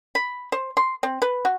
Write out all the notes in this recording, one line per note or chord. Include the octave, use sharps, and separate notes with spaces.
B5
C5
C6
C4
B4
F#4